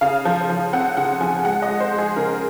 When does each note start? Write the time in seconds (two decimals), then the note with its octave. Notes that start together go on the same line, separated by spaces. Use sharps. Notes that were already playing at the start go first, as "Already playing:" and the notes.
0.01 C#3 F5
0.25 F3
0.49 F3
0.73 C4 F#5
0.97 C#3 F#5
1.21 F3 G#5
1.45 G#3 F#5
1.62 D#5
1.69 G#3
1.80 C5
1.93 G#3
1.98 G#4
2.16 C#3 A#4